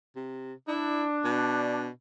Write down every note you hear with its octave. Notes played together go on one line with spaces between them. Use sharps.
C3
D4 E4
B2